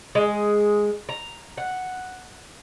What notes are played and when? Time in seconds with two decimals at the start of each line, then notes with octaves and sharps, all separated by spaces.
0.15 G#3
1.09 A#5
1.58 F#5